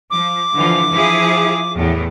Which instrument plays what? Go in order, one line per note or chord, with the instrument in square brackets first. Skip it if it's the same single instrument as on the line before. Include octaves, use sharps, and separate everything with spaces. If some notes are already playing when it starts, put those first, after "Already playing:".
[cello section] F3 [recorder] D6
[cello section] D3 E3 F3
F3 E4 G#4
E2 A2